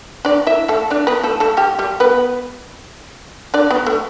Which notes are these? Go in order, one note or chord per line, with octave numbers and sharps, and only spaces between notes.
D4 D5
E4 E5
A3 A4
D4 D5
B3 B4
A3 A4
A3 A4
G3 G4
G3 G4
B3 B4
D4 D5
B3 B4
A3